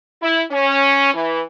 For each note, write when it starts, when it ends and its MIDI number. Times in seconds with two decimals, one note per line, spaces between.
0.23 0.42 64
0.52 1.14 61
1.14 1.41 52